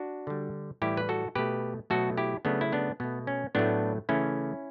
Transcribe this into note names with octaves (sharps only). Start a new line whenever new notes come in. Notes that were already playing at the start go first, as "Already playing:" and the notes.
Already playing: D4 F#4
D3 G3
A2 E3 G3 E4 G4
B4
F#4 A4
B2 A3 G4 B4
B2 F#3 A3 F#4 A4
E4 G4
C#3 F#3 A3 B3 D4
E4
B3 D4
B2 A3 B3
C#4
A2 F#3 A3 B3 D4
C#3 E3 A3 C#4 E4